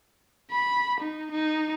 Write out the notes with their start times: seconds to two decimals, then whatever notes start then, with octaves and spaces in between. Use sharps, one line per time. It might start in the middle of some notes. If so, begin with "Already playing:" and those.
0.51 B5
1.01 D#4
1.32 D#4